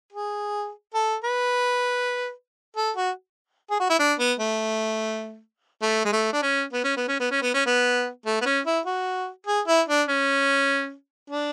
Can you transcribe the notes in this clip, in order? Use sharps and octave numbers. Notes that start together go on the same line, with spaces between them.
G#4
A4
B4
A4
F#4
G#4
F#4
E4
D4
B3
A3
A3
G#3
A3
D4
C#4
B3
C#4
B3
C#4
B3
C#4
B3
C#4
B3
A3
B3
C#4
E4
F#4
G#4
E4
D4
C#4
D4